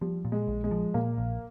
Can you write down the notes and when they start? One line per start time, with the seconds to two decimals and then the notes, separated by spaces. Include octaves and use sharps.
0.01 F3 G3
0.25 A#2
0.32 G#3
0.48 A#1
0.64 G#3
0.71 F3
0.94 A#2 A#3
1.18 A#1